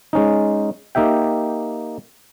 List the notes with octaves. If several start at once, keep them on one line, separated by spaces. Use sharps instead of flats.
G#3 C#4 D#4
A#3 D#4 G4 E5 G5